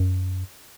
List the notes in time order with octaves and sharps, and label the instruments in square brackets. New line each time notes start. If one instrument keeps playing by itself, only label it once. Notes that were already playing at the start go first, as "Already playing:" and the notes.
Already playing: [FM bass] F#2